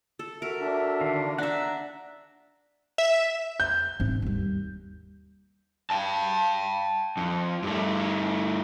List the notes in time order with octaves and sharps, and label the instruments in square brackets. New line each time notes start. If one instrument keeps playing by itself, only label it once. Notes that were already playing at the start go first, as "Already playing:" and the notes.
[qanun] A4
[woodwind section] F#4 A4 E5 [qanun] A#4
[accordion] D4
[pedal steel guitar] D3 D#3 F5
[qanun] D4 E5 [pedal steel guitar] F#5 A#5
[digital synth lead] E5
[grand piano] G6
[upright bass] G#2 C4
D#2 G3
[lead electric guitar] G5 A5
F2
G2 A3